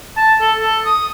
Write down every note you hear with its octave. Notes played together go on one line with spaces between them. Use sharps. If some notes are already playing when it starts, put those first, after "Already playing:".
A5
A4
A4
D#6